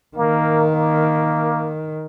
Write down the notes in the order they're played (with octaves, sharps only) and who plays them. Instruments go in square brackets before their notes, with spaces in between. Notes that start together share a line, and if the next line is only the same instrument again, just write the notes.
[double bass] D#3 [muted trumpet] A#3
[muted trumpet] A#3